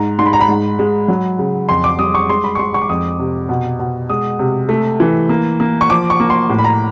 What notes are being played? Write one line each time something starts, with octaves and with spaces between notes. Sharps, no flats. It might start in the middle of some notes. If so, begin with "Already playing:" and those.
Already playing: G#2 A#5
G#2 C6
B5
A#5
B5
G#2
G#3
F#3
C#3
F2 C6
D6
G3 D#6
C#6
G#3 C6
B5
C#6
G#3 C6
C#6
D6
F2 D#6
C3
B2
B2
G#3 D#6
C3
A3
E3
A#3
A#3
C#6
F3 D6
C#6
A#3
C6
A2
B5
A#5